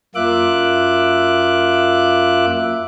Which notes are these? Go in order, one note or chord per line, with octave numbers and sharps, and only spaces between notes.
F#2 A#3 F4 E5 D6 F#6